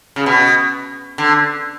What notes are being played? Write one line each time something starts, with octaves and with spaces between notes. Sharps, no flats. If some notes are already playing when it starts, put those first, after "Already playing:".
C#3
B2
D3